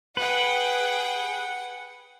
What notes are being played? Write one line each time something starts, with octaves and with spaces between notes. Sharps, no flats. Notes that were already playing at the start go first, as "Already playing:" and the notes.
G#4 B4 F#5 G5